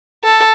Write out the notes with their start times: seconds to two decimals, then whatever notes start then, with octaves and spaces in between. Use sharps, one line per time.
0.24 A4